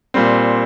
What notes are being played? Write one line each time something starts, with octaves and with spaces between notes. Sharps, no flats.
A#2 G3 C4